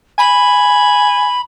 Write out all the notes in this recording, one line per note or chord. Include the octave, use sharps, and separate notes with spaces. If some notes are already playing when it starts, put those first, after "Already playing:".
G#5 B5